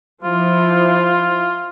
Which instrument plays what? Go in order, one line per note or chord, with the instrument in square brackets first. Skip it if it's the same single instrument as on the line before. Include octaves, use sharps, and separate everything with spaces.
[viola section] F3 E4 [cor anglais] F4